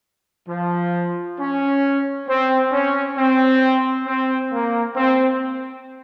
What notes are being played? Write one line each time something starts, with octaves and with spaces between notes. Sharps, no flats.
F3
C#4
C4
C#4
C4
C4
A#3
C4